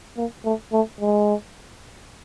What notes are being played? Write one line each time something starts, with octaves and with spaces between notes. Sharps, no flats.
A#3
A3
A3
G#3